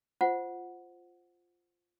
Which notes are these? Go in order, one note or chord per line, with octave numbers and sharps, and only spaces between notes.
F4 C5 F#5